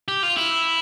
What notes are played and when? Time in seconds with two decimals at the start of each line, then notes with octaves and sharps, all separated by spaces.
0.08 G4
0.23 F4
0.37 E4